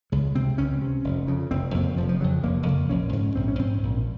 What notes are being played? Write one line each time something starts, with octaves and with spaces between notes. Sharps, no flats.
C#2 G#3
C3 C4
C#2 C#4
C3
F1
F2 C#3
F1 C4
F2 C#3 A#3
F1 F3
F3
F2 C#3 F#3
F1 A#3
F2 C#3 A#3
A#1 C#4
G#2
A#1 C4
C#4
G#2 C4
A#1